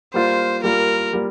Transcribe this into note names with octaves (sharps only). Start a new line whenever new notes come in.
G3 A#3 F4 C5
G3 A#3 F4 A#4
G3 A#3